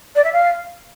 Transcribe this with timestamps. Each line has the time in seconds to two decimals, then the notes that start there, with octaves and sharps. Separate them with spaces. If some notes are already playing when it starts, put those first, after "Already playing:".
0.16 D5
0.24 E5
0.33 F5